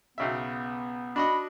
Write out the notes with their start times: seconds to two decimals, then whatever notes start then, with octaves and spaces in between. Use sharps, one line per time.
0.18 B1 C#3 B3 E5
1.16 D4 F#4 D#5 B5